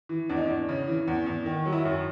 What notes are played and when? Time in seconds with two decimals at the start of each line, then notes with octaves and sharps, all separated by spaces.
0.09 E3
0.29 E2 D4
0.37 D#4
0.47 E2 D4
0.69 C#3
0.87 E3
1.07 E2
1.26 E2
1.46 D#3
1.65 F#3
1.72 E4
1.85 F#2